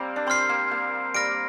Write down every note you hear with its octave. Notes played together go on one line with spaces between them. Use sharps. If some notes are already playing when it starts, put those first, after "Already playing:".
Already playing: G3 A#3 C4
D4
C4 C6 F6 C7
A#3
A#3
G3 F6 A#6 D7